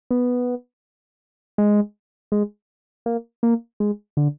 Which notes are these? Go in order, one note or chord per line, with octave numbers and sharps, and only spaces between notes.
B3
G#3
G#3
A#3
A#3
G#3
D3